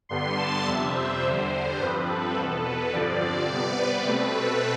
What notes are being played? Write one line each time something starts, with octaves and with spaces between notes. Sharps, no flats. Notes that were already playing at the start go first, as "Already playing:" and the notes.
G2 D3 G3 B3 C6
A5
F2 C3 G3 E5
C5
E2 D3 G3
G2 F3 C4 B4
A4
E2 B2 B3 A4
B4
G2 D3 F3 C4 D5
C3 G3 B3
B4
B2 A3 C4
A4